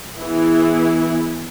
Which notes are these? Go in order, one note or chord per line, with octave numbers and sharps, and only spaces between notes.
E3 B3 E4 G#4